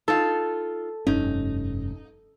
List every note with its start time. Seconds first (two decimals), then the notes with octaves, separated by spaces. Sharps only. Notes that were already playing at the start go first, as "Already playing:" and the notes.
0.08 D#4 F4 A4
1.07 F1 G2 C#4 D#4